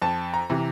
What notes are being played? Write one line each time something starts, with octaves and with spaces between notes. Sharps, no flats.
F2 A5
A#5
C3 E3